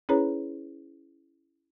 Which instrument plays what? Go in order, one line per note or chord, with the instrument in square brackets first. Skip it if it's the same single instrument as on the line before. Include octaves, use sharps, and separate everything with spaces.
[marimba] C#4 E4 G#4 B4 C#5 A#5